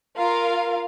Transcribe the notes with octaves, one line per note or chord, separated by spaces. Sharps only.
F4 A#4 F5